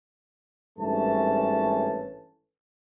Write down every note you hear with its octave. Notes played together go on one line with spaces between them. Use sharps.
G#1 G2 E3 A3 C#4 A5